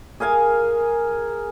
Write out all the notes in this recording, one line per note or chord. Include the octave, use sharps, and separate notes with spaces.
G#4 A#4 F5 G#5